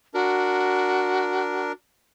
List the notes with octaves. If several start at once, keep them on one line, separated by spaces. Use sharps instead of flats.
D4 F#4 A#4